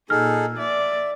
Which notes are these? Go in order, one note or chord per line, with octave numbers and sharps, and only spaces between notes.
A#2 D#4 G#4 A4 F6
D5 E5